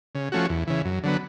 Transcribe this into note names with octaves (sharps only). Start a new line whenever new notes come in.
C#3
F3 A3 C#4 F#4
E2
C#3 E3
F#2
D3 F#3 B3